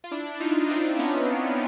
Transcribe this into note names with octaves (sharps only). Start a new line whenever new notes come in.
F4
D4 E4
D#4 F4
C4 D4
B3 C#4